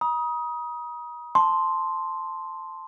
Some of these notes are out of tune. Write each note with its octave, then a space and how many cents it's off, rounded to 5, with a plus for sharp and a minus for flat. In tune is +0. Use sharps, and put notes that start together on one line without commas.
A#5 +45 D#6 +15
A5 +0 C6 +0